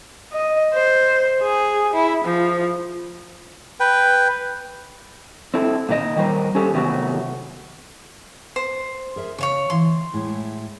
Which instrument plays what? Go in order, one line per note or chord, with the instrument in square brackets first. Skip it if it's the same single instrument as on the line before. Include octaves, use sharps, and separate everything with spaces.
[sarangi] D#5
C5
G#4
E4
F3
[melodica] B4 G5
[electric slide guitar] C4 E4 A4
A#2 D#3 D4 D#5
D#3 G3 A#4 C5
C#4 G4 A4 C5
C3 D#3 F#3 A3 B3 F#4
[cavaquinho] C5
[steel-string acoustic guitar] G#4 A#4 E5
[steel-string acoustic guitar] C#3 [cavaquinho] C#5 F5 C#6
[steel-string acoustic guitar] D2 E3 [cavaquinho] C6
[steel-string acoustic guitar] A2 G#3 E4